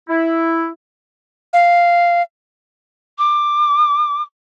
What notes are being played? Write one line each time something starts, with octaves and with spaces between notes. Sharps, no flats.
E4
F5
D6